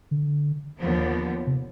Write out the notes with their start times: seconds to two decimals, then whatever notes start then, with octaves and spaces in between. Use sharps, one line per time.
0.11 D3
0.79 D#2 D3 F3 B3
1.47 C3